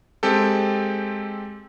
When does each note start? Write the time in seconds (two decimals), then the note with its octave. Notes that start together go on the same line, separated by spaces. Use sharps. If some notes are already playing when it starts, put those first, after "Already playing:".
0.23 G#3 C4 G4 A4